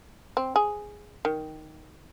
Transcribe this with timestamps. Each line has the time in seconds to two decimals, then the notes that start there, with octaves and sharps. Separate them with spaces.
0.37 C4
0.56 G#4
1.25 D#3